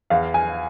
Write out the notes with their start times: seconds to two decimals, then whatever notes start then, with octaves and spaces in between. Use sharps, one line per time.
0.10 E2 F5
0.34 G#5